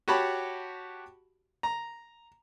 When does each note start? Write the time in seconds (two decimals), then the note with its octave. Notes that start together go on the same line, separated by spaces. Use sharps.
0.08 F#4 G4 C#5 A5 B5
1.63 A#5